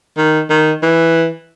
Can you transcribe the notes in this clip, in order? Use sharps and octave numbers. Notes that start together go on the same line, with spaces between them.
D#3
D#3
E3